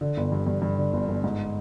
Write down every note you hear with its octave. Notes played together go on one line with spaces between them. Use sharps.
D3
G1
G2
G2
G2
D3
G1
G1
G#2